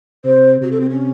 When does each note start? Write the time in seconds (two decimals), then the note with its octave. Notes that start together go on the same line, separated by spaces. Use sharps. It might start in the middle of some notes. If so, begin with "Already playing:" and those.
0.25 C3 C5
0.61 C3 F#4
0.71 A4
0.80 C4
0.90 C#4